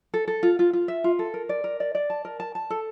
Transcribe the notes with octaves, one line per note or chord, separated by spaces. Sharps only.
A4
A4
F4
F4
F4
E5
F4
A4
A#4
D5
A#4
D5
D5
A5
A#4
A5
A5
A4